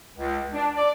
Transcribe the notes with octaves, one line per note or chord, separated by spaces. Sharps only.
C#2
D4
D5